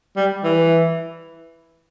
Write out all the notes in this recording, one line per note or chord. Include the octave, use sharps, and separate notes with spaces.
G3
E3